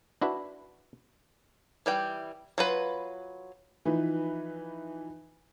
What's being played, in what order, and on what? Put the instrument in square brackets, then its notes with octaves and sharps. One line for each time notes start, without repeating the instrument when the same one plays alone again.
[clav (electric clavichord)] D4 E4 F#4 B4
[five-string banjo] E3 G3 G5
F#3 F4 B4
[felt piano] E3 F3 D#4 B4